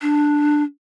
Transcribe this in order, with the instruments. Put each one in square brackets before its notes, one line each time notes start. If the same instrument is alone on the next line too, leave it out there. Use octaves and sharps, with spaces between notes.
[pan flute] D4